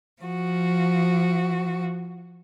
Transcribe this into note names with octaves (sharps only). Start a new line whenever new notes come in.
F3 F#4